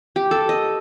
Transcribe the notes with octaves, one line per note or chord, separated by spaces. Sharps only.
G4
A4
D#5